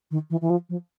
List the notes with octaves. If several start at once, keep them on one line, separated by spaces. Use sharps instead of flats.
D#3
E3
E3
F3
F3